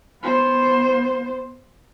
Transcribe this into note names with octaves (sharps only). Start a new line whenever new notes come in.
B3 C5